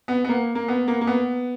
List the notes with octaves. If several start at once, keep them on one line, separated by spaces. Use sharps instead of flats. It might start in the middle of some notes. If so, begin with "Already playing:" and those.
B3
B3
A#3
A#3
B3
A#3
A#3
B3